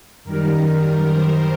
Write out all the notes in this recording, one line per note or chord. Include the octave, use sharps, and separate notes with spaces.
F#2 D#3 G3 A#4
C5